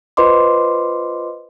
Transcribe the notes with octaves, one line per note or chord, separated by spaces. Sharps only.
F4 B4 C5 D#5 C6 D6